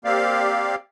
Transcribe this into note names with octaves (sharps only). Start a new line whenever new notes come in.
A#3 C4 G4 D5 F5